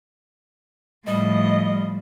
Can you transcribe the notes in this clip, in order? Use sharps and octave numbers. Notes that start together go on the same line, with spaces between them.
A2 F3 G3 D#5